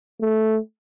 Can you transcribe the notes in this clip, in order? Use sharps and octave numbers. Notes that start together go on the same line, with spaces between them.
A3